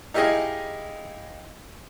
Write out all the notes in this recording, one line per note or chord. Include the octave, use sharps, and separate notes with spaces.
D#4 E4 G4 G#4 D#5 F5